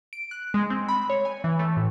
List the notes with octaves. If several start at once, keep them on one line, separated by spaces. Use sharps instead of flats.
D7
F#6
G#3
C4
B5
C#5
G#5
E3
A3
A2